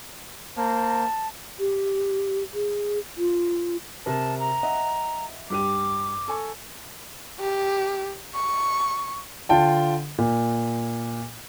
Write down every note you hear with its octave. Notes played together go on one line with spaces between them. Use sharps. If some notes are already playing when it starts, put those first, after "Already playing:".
A#3 C5 A5 A#5
G4
G#4
F4
C3 A#4 A5
A#5
D#5 E5 F#5
G2 G4 D6 D#7
A4 G#5 C#6
G4
C#6
D3 F4 G5 A5
A#2